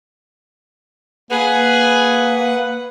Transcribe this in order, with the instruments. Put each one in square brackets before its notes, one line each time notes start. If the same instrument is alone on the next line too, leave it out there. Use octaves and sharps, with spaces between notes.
[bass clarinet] A#3 [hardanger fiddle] G#4 [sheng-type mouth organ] B4 F#5